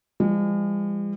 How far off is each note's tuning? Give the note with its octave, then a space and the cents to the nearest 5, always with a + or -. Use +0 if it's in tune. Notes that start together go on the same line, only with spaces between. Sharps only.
F3 -35 G#3 -45